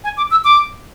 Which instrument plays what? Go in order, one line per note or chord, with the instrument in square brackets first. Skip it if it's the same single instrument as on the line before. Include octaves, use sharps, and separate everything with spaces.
[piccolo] G#5
D6
E6
D6